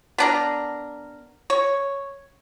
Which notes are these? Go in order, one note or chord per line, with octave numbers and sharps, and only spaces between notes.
B3 D4 A#4
C#5